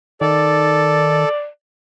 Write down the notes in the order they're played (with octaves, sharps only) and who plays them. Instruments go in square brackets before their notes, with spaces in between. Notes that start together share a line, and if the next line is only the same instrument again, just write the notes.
[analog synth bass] D#3 [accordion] A4 [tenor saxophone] D5